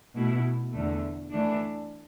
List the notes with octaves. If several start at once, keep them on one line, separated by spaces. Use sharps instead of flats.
B2 A3 E4
E2 D3 A3
E3 A3 D4